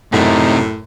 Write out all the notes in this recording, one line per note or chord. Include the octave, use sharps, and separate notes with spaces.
F#2 A2 C3 A3 D#4